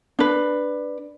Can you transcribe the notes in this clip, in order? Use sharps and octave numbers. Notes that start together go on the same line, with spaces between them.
D4 B4